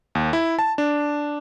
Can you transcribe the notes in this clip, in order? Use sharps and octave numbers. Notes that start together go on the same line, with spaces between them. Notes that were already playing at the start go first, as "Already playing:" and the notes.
D#2
E4
A5
D4